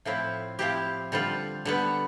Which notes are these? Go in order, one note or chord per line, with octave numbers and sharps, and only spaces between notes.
A2 F3 C4 E4
F3 C4 E4 G4
D3 G3 C4 F4
D3 G3 B3